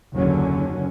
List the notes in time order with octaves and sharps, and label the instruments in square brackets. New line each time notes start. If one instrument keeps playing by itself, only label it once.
[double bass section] F#1 D#2 D3 F#3 C#4